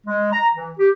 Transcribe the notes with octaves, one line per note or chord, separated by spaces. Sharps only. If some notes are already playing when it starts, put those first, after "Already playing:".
G#3
A#5
E3
G4